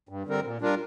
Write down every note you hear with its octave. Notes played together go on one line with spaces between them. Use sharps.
G2
D3 G3 C4 A#4
A#2
G3 D4 F4 A#4